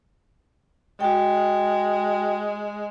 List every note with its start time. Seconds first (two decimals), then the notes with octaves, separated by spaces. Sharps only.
1.00 G#3 F#4 G5